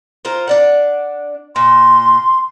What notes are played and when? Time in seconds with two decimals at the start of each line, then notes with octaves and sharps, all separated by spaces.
0.25 F4 A#4 C5
0.47 D4 D5 F#5
1.56 A#2 C6